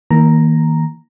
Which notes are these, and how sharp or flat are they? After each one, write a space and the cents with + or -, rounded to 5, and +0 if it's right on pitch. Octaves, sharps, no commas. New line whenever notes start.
D#3 +40 A#3 +0 A#5 +0